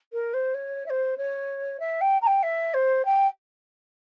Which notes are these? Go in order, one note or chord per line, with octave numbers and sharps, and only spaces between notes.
A#4
C5
C#5
E5
C5
C#5
E5
G5
A#5
G5
E5
C5
G5